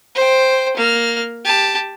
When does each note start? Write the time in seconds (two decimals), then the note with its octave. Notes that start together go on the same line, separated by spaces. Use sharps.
0.15 C5 G5
0.77 A#3 F6
1.45 G4 A5